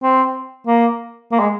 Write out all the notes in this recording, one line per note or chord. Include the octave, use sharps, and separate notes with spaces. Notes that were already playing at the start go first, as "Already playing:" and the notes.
C4
A#3
A#3
G#3